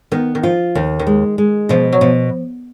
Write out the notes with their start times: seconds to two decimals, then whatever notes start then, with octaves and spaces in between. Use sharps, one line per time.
0.12 D#3 B3
0.35 D#3
0.43 F3 F4
0.75 D#2 D#3
0.99 D#3
1.07 G#3
1.38 G#3
1.69 B2 F3
1.92 F#3
2.01 B2 F3